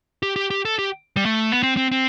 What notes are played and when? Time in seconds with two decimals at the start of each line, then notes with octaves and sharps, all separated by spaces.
0.23 G4
0.36 G4
0.51 G4
0.65 A4
0.79 G4
1.17 G3
1.25 A3
1.52 B3
1.63 C4
1.77 C4
1.92 C4